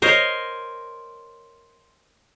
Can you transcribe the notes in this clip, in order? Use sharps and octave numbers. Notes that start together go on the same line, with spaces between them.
A#4 C5 C#5 D#5